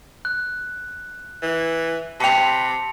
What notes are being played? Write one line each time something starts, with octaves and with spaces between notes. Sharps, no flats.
F#6
E3
C3 B4 G5 A5 C#7 F7